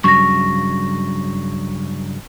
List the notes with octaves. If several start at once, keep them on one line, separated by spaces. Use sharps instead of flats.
G2 C#3 F#3 C#6 A#6